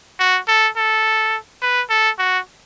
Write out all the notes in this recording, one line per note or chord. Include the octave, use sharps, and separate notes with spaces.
F#4
A4
A4
B4
A4
F#4